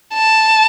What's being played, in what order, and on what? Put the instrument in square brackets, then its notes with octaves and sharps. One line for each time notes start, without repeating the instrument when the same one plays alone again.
[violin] A5